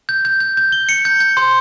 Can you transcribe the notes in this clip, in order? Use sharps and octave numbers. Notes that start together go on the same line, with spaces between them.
G6
G6
G6
G6
G7
C#7
G6
G6
C6